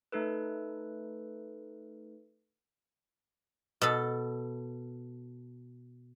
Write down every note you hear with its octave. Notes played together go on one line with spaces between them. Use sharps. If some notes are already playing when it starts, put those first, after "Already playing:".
A3 D#4 A4 B4
B2 A4